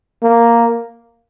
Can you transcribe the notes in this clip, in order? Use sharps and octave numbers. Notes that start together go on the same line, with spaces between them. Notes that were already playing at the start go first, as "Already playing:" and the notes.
A#3